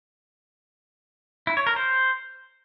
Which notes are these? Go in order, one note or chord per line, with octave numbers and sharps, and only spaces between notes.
E4
C#5
A#4
C5